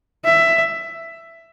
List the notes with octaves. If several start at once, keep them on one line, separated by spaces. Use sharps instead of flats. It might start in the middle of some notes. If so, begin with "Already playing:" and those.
E5